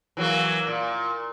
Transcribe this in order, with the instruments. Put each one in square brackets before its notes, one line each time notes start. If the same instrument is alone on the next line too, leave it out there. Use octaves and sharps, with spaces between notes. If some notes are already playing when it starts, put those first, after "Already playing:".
[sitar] E3 F#3 A#3
A#2